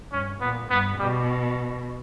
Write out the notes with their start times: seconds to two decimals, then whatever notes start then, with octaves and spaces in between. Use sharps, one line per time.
0.12 G2 C#4
0.41 A#2 B3
0.70 G2 B3
0.99 B2 G3